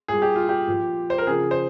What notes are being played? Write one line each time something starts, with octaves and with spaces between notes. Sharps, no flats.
A#2 G3 G#4
G4
F4
G4
A#2 F3
C5
A#4
C#3 F3 G#4
C5